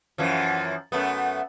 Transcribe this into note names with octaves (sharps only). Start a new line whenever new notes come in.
F#2 E3 F3
F#2 A3 B3